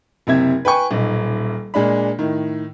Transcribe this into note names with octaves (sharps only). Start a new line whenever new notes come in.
F#1 C3 C4 E5 G#6
B4 G5 G#5 C#6
D#1 B1
A#2 G#3 D4 B5
A2 D#3